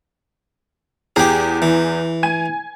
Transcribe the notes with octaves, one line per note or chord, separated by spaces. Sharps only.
E2 G4 G#4
E3
G#5 G#6 D#7